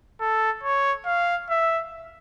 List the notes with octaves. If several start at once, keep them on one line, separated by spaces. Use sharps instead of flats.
A4
C#5
F5
E5